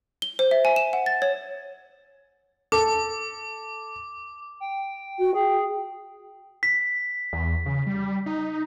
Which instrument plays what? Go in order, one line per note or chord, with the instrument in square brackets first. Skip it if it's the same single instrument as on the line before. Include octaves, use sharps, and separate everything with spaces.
[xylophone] G7
C5
E5
G#5
E7
F#5
A6
C#5
[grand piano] A4 [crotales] D6
[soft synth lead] G5
[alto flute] F#4
[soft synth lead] G#4 [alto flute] G5
[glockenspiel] B6
[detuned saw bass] E2
C#3
G3
D#4